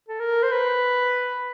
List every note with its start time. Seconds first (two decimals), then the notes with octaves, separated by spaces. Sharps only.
0.09 A4
0.20 A#4
0.43 C5
0.52 B4